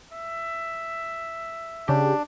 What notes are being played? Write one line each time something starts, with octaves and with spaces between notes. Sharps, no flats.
E5
C#3 D4 G4